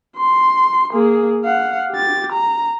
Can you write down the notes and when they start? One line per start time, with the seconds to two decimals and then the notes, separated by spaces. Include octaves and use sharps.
0.17 C6
0.93 A#3 G#4
1.45 F5 F#5
1.91 G4 A6
2.32 A#5